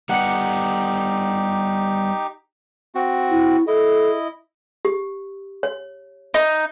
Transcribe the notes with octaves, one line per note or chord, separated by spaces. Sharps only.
G3 B3 D#4 G4 F#5 C#7
C4 F#4
E4
E4 A4 D#5
G4
C#5
D#4